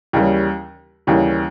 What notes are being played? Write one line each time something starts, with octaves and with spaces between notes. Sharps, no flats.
D#2 C#3 E3 G3
D#2 C#3 E3 G3